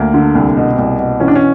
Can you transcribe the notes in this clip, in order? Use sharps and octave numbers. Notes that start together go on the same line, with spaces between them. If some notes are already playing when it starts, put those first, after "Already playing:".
Already playing: D2 A#3
D3
C2
B2
C2
B2
E3 C#4
D4
C#4